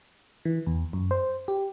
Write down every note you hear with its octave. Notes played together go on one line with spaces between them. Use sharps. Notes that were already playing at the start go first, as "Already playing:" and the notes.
E3
E2
F#2
C5
G4